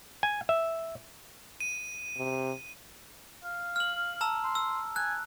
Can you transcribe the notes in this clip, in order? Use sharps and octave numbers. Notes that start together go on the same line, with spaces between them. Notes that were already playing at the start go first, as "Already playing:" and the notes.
G#5
E5
D#7
C3
F5
F6 F#7
A5 A#5 E6
C6
E6
G#5 F#6